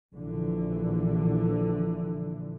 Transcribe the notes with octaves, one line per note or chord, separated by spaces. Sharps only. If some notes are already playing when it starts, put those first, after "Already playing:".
A#1 D3 E3